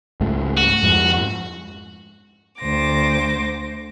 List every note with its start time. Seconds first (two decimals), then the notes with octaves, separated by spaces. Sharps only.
0.21 C#2 G#2 A3
0.57 F#4
0.83 F2 G#2
2.60 D2 C5 D6 A#6